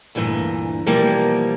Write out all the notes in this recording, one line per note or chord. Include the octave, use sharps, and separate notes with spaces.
D2 G2 A#2 E3
B2 E3 F3 G3 A#3